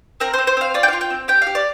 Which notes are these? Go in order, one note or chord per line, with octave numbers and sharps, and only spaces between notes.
C4 A#4
C5
C4
C5
C4 F5
F4 D5
G5
F4 F5
G5
C4
G4 G5
F5
G4
D5